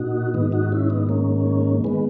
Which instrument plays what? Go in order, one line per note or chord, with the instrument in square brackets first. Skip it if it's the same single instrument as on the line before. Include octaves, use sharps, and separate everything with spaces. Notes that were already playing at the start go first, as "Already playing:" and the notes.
Already playing: [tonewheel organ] A#2 D#4 F#4
G#2 D#3 B3 D#4
D#4 F#4
C#4 E4
B3 D#4
A#3 C#4
D#3 G#3 B3